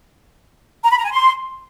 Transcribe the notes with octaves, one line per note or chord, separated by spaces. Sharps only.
A#5
B5
A#5
G#5
C6